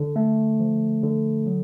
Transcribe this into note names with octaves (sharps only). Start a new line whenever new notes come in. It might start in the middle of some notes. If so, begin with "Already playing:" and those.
Already playing: D3
A3
F3
D3
F#3